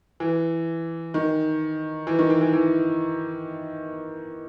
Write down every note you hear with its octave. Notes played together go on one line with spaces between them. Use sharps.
E3
D#3
E3
D#3
E3
E3
E3